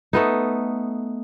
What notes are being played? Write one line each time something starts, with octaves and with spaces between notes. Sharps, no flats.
A3 B3 D#4